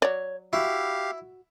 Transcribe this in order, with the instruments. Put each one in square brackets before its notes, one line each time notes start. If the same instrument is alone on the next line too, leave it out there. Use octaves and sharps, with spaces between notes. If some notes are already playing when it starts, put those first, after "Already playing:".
[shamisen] F#3 D5 [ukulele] C#5
[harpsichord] E4 [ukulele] F#4 [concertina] G4 F5